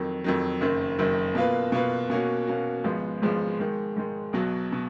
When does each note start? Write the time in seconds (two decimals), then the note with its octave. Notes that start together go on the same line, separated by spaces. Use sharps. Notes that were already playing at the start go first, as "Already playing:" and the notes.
Already playing: F2 D#3 F#3
0.24 F2 D#3 F#3
0.61 F#1 F#2 D#3
0.99 F#1 F#2 D#3
1.35 B2 A#3 F4 B4
1.72 B2 A#3 F4 B4
2.10 B2 A#3 C#4 F#4
2.47 B2 A#3 C#4 F#4
2.84 G#1 G#2 F3 G#3 B3
3.22 G#1 G#2 F3 G#3 B3
3.59 G#2 D#3 G#3
3.97 G#2 D#3 G#3
4.33 B1 B2 F#3
4.72 B2